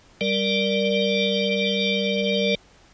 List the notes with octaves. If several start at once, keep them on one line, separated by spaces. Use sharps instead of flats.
G3 A#4 D5